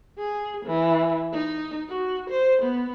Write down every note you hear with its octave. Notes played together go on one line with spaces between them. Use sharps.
G#4
E3
D#4
F#4
C5
B3